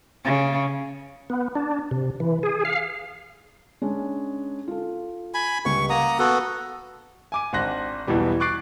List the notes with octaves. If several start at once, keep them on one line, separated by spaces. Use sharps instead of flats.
C#3
B3
D4
C3
E3
G#4
F5
G#3 C#4 D4
F4 A4
G#5 B5
C#2 G3 C#6
A#3 F#5 A#5 D#6
B3 F#4 A4
G#5 D6 D#7
G#1 D4 F#5 C6 F#6 A#6
B1 E2 B2 E3 G3
C#6 D6 F#6 A6 C7 D7